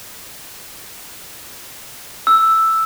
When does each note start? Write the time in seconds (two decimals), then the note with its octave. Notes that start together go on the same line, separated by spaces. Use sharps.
2.27 E6